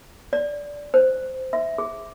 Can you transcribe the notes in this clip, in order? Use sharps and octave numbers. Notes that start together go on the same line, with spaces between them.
D5
C5
E5
G#4